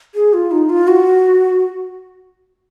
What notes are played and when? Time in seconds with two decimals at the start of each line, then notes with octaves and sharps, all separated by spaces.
0.15 G#4
0.33 F4
0.51 D#4
0.69 F4
0.87 F#4